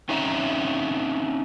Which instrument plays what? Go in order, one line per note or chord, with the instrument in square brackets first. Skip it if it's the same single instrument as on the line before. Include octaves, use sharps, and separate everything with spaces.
[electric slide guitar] C4 C#4 D#4 E5 F#5 A#5